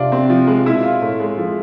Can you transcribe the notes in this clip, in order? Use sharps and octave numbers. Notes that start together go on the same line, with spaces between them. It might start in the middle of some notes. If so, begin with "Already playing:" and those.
Already playing: C3 D4 F4
C4
F3
G#3
B2 E4
F4
A2 A3
G#3
G#2 F3